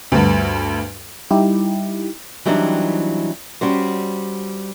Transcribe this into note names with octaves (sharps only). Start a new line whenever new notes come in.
D2 G2
G3 D#4 E4 G4
E3 F#3 G3 C4 D4 D#4
G3 C#4 F#4 C5